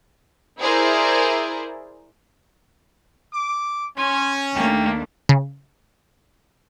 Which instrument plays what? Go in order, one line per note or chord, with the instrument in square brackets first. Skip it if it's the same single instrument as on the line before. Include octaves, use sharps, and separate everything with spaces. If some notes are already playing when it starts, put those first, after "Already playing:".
[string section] E4 G#4 A#4 C5 D5
[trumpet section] D6
[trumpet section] C#4 [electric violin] G#5 [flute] C6
[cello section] D#2 A3 D4 [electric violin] A#3 [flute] G5
[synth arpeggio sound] C#3